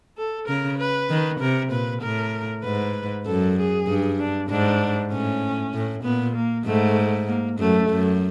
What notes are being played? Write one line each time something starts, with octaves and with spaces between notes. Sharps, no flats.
A4
C#3 A#4
B4
D#3
C3 A#4
A#2 B4
A2 A#4
G#2 B4
F#2 A4
G#4
G2
D4
G#2 D4
A2 C#4
A2
A#2 B3
A#3
G#2 A3
A#3
F#2 A3
F#2